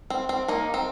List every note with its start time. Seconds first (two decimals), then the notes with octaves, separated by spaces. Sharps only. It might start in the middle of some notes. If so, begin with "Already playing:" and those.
0.10 C4
0.29 C4
0.48 A#3 D#4
0.74 C4